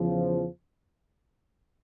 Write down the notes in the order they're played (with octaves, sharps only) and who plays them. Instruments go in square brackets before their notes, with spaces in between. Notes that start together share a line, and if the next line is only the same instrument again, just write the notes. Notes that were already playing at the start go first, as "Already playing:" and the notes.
Already playing: [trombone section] E2 C#3 F3